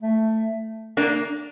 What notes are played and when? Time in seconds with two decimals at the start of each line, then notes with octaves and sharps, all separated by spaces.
0.02 A3
0.97 A#3 D4